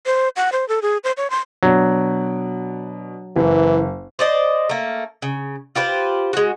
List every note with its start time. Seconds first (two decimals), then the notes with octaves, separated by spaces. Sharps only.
0.06 C5
0.36 F#5
0.52 C5
0.68 A4
0.82 G#4
1.04 C5
1.17 C#5
1.30 C6
1.63 B2 F#3 D4
3.36 F#1 E3
4.19 C5 D5 D#5
4.69 A3 A#3
5.22 C#3
5.75 F4 G4 B4 C5
6.33 G#3 F#4